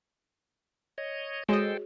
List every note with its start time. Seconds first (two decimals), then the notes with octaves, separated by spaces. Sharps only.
0.98 C#5 D#5
1.49 G#3 F#4 G#4 A4 C5 C#5 D#5 G5